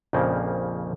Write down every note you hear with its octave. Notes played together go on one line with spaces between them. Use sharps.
A#1 F2 A#2 C#3 F3 A#3